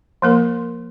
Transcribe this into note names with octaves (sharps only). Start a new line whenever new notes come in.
F3 A#3 A#4